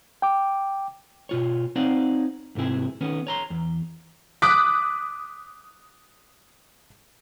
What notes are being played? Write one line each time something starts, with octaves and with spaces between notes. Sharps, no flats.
G5 D6
B2 F4 C#5
C4 D#4 C#5 D5 F5 F#5
C2 G#2 C3 E4 G#4
D#3 B3 C#4
C#5 A#5 C6
E2
D6 D#6 F#6 B6